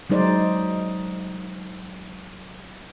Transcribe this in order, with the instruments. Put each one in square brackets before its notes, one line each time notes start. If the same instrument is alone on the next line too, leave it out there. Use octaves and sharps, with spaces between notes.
[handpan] F#3 G#3 D#4 C5 D5